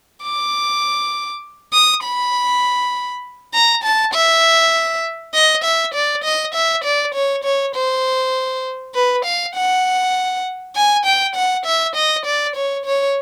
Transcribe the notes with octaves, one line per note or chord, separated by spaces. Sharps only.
D6
D#6
B5
A#5
A5
E5
D#5
E5
D5
D#5
E5
D5
C#5
C#5
C5
B4
F5
F#5
G#5
G5
F#5
E5
D#5
D5
C#5
C#5